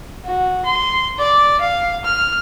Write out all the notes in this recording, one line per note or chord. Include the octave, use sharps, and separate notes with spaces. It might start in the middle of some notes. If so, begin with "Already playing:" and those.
F#4
C6
D5
F5
F6